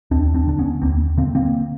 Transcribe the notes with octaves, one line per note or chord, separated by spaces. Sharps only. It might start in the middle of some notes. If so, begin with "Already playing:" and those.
D#2 C4 D4
C4 D4
D3 D4
B3 C#4
D#2 A#3 C4
D3 A#3 C4
A#3 C4